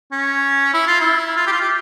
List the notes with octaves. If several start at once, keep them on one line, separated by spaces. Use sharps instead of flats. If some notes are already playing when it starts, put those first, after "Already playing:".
C#4
E4
F4
E4
F4
G4
F4
G4